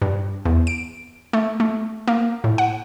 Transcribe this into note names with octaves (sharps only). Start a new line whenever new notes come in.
G2
E2
D7
A3
A3
A#3
A2
F#5